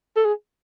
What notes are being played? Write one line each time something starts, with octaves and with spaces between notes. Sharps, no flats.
A4
G#4